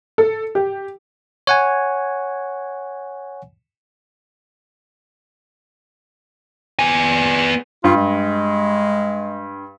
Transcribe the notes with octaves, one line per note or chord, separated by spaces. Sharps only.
A4
G4
C#5 F#5 G#5
B3 G#5
G2 F4
G#3